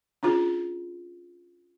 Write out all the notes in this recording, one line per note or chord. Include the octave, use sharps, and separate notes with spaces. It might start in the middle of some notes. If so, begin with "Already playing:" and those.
C#4 D4 F4 G#4